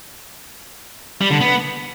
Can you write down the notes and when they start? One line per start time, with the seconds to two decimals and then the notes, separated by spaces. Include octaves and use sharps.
1.21 G3
1.31 D3
1.41 B3